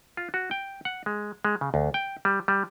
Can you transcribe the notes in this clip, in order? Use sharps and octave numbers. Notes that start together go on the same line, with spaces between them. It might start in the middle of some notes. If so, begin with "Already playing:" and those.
F4
F#4
G5
F#5
G#3
G#3
C#3
D2
G5
G3
G3